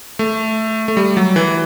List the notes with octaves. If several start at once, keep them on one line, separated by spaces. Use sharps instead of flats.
A3
A3
G3
F#3
E3